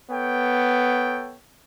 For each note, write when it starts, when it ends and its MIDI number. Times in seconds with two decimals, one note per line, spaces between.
0.10 1.37 59
0.10 1.37 69
0.10 1.37 73
0.10 1.37 79